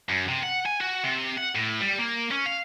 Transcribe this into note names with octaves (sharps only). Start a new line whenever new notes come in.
F#2
C3
F#5
G#5
F#4
C3
F#5
A2
G3
A#3
C#4
F5